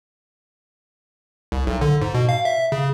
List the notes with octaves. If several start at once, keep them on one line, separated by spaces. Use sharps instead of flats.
C2
B1
D3
G#2
B2
F5
E5
C#3